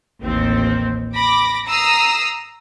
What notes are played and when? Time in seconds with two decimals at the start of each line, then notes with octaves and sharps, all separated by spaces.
0.22 A1 D#2 C4
1.14 B5 D6 A#6
1.66 A#5 D#6 E6 C7